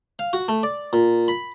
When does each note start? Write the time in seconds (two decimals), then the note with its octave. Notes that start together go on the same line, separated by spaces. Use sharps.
0.19 F5
0.33 F#4
0.48 A3
0.63 D5
0.93 A#2
1.28 B5